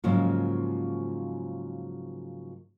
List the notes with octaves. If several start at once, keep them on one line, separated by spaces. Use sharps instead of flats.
G#2 C#3 F3 F#3 A#3